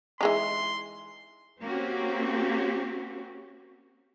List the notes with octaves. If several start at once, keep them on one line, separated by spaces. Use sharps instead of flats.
E3 G#3 D#4 C6
A#3 C4 C#4 F#4 G4